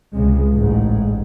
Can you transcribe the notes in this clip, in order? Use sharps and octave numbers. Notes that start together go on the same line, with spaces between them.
C#2 C3 G#3
A1 G#2